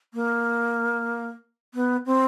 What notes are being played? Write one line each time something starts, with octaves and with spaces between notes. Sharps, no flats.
A#3
B3
C4